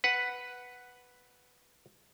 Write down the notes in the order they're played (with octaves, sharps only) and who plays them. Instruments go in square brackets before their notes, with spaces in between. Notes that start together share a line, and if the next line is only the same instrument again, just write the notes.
[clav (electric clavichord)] B4 F#5